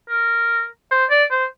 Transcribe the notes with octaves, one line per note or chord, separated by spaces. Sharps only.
A#4
C5
D5
C5